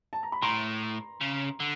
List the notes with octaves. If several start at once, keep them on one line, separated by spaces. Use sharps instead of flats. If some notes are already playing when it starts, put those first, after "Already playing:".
A5
A#5
B5
A2 A#5 C6
C#3
D3